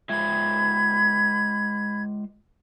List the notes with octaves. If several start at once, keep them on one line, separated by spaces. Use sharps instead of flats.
G#3 F4 E5 B5 G#6